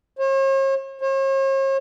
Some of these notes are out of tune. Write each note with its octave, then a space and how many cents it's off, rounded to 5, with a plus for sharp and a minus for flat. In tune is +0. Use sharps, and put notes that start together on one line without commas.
C#5 -45
C#5 -45